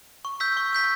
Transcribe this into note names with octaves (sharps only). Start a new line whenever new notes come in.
C#6
E6 G6 B6
C#6
E6 G6 B6